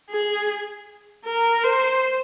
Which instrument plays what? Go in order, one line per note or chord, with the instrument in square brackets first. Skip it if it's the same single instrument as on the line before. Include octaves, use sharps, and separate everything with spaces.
[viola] G#4
A#4
C5